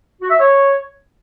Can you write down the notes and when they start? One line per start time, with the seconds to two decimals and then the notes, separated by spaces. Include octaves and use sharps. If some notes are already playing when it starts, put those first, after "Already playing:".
0.21 F#4
0.30 E5
0.39 C#5